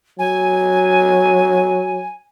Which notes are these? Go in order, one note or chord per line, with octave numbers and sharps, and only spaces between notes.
F#3 G#5